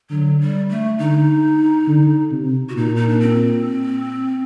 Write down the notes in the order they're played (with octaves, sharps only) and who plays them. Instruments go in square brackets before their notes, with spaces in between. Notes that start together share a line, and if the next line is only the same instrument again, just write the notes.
[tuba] D3 [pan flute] F#3
[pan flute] G3
A3
[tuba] D3 [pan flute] D#4
[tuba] D3
C3
[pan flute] F#4
[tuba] A#2 [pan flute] D#4
[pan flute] D#4
D4
C4